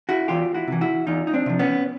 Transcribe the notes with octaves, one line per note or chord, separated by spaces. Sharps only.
E4 F#4
E2 F4 G4
E4 F#4
C3 E3
E4 F#4
E2 D#4 F4
D#4
C4 D4
C3 F3
B3 C#4